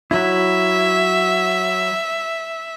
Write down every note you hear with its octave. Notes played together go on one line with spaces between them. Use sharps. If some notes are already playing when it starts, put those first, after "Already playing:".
F#3 E4 E5